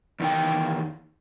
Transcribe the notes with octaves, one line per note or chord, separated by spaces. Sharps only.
E2 D#3 G5